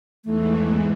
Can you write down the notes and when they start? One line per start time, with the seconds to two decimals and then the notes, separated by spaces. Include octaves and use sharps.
0.25 E2 G#2 E3 A3